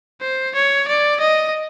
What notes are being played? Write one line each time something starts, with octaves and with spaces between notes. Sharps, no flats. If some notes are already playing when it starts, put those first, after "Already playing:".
C5
C#5
D5
D#5